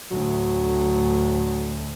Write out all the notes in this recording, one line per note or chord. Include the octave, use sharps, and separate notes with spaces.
D2 A2 F#3